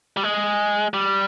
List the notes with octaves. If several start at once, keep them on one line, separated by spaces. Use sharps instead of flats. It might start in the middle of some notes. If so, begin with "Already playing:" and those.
G3
G#3
G3